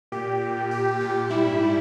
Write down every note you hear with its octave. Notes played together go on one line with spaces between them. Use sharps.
A#2 G4
A#2
A#2
A#2
A#2 G4
A#2
A#2 G4
A#2
G3 E4
G#2
G3